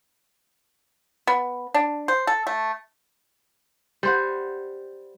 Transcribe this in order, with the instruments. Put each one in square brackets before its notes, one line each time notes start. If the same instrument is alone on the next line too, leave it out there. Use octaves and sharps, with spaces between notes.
[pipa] B3
D4
C5
A4
A3
[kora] G3 C5 F#5